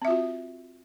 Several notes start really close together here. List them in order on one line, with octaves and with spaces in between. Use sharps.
C4 E5 F4 F#4